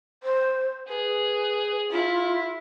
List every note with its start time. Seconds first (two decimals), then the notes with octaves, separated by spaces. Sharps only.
0.23 C5
0.89 G#4 B4
1.92 E4 F4